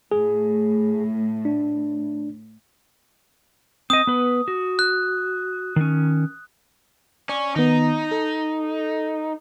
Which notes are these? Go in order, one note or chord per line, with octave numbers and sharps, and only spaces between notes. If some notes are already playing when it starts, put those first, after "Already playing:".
A2 G#4
D4
C4 D#5 D#6
B3 B4
F#4
F#6
D#3 C#4
C#4 D5
D#3 B3 D#4
A4